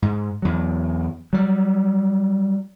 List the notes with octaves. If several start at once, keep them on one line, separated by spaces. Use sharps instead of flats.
G#2
E2 F#3
F#3 G3